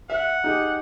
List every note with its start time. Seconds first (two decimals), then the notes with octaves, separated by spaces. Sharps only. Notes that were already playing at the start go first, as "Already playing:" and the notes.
0.10 E5 F#5
0.44 D#4 G4 G#4